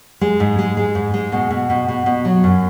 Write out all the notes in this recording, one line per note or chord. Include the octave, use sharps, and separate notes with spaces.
G#3
G#2
G#3
G#3
G#2
G#3
B2
B2
B2
B2
B2
F#3
F#2